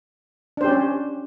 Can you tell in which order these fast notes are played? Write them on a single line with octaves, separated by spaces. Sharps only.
D4 C5 G4 C#4